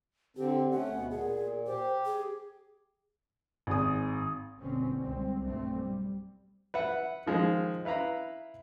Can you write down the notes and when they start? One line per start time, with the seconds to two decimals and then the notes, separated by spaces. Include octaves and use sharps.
0.37 D3 C4 G4
0.71 A3 C#4 F#5
0.92 D2 B2 B3
1.11 A#2 G#4
1.67 G4 C5
2.06 G#4
3.67 G#1 G#4 D#6
4.60 F#1 B2 D3 G3 C4 C#4
4.99 C#2 G3 C4
5.42 B1 G2 A3 C4
5.75 G3
6.74 B4 E5 F#5
7.26 D#3 F3 G#3
7.85 E4 B4 F5 A#5 B5